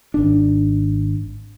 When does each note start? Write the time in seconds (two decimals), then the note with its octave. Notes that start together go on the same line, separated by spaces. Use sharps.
0.14 G#1 D4